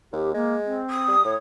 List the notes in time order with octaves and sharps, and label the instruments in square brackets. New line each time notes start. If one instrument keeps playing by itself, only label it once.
[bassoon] D#2 [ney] G4
[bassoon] G#3 [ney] A#3
[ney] C4
[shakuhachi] D#6
[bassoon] G3
[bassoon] A2 [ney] C#5